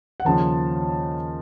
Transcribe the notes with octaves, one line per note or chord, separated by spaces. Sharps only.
F#5
D#2 C#3 F3 A5